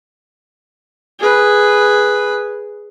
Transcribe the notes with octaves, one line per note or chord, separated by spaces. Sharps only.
G#4 B4